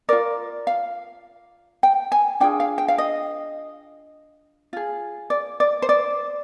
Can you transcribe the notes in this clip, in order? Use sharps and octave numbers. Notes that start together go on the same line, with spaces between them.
F4 A#4 D5
F5
G5
G#5
D4 F4 G#4 G5
F5
G5
F5
D#5
F4 G#4
D5
D5
C5
D5